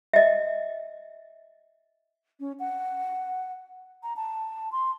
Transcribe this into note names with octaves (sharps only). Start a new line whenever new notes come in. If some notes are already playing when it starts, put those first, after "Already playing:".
D#5 E5
C#4
F#5
A#5
A5
C6